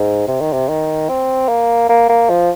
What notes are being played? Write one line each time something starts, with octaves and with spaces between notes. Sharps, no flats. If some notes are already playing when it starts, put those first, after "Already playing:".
Already playing: G#2
C3
D#3
C3
D#3
C4
A#3
A#3
A#3
F3